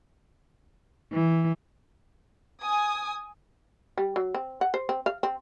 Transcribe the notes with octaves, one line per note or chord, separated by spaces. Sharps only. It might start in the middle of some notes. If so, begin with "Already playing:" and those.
E3
G#5 D#6
G3
F#3
C4
F#5
C5
C4
F5
C4